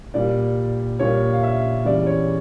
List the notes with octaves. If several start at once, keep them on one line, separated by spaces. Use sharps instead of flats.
A#2 G3 D5
A#2 G3 C#5
F5
E5
E2 C#3 E3 G3 D5
C#5